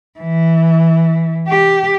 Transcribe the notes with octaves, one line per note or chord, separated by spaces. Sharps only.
E3
G4